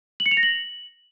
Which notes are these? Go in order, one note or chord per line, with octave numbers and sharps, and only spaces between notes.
F#7
C#7
F7
A#6
F#7